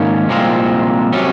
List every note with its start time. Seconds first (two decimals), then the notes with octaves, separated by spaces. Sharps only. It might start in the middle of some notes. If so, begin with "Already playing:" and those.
Already playing: G#2 D#3 A#3 C#4
0.28 C2 A#2 F3 G#3 C4
1.13 C3 F#3 C#4